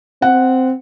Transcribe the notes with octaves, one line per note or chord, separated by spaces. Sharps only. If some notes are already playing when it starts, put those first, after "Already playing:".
C4 F#5